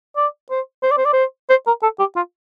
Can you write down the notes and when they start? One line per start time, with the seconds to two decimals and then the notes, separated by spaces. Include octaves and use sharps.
0.16 D5
0.50 C5
0.83 C5
0.91 D5
0.97 C5
1.05 D5
1.13 C5
1.50 C5
1.67 A#4
1.83 A4
1.99 G4
2.16 F4